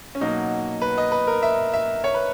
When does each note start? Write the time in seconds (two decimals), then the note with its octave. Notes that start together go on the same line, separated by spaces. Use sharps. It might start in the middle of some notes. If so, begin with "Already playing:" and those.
0.15 C#4
0.21 B2 F#3 A#3 D#4
0.82 B4
0.98 D#5
1.12 B4
1.27 A#4
1.43 E5
1.74 E5
2.04 C#5
2.14 B4